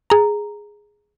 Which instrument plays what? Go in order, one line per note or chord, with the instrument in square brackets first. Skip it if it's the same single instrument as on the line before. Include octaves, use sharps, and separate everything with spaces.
[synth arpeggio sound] G#4 A#5